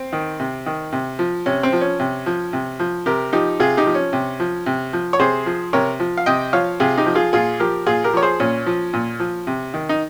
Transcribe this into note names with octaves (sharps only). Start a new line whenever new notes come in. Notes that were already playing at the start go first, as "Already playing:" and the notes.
Already playing: C4
D#3
C3
D#3
C3
F3
C3 C#4
C4
F3
C#4
C3
F3
C3
F3
C3 G4 A#4
F3 D#4 G4
C3 F4 G#4
D#4 G4
F3
C#4
C3
F3
C3
F3
C#5
C3 G#4 C5
F3
C3 A#4 C#5
F3
F5
C3 D#5 G5
F3 C#5 F5
C3 F4 G#4
D#4 G4
F3
F4 G#4
A#2 F4 G#4
F3 G4 A#4
A#2 F4 G#4
G4 A#4
F3 C#5
G#4 C5
A#2 C#4
F3
A#2
F3
C3
D#3
D#4